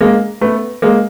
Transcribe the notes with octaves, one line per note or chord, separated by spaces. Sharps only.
G#3 A#3
A3 B3
G#3 A#3